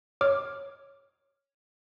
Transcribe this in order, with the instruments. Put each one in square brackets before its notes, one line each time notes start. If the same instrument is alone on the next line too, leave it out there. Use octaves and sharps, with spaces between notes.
[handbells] C#5 D6 F6